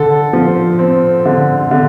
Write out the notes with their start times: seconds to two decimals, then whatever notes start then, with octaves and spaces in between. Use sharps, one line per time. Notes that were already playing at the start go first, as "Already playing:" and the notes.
Already playing: D3 A4
0.33 F3
0.79 C4
1.26 D3
1.71 D3